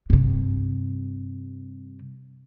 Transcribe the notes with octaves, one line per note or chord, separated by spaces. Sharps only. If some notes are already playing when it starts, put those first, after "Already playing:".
G2 C3